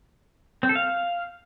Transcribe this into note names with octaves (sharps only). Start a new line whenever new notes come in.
C4
A4
F5